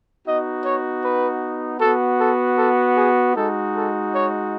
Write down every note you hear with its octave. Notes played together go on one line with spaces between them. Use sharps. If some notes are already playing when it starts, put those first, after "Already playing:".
B3 D#4 F#4 D#5
C#5
B4
B3 F#4 A4
A4
A4
G#4
G#3 D#4 F#4 A4
A4
C#5